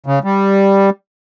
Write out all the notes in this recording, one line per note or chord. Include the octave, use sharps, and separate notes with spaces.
C#3
G3